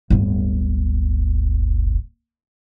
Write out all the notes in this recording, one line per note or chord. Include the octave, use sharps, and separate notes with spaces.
D1 G1